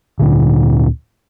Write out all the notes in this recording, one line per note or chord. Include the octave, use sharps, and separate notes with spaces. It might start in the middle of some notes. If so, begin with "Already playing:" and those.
D2 A#2 D3